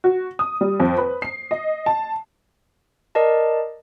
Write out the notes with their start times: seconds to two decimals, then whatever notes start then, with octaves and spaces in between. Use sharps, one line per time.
0.04 F#4
0.39 D#6
0.61 G3
0.80 F2
0.98 B4
1.22 C7
1.51 D#5
1.86 A5
3.15 A#4 D5 D#5 A5